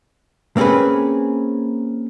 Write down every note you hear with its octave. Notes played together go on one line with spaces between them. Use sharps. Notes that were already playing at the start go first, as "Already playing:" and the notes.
A#3 C4 C#4 G#4 B4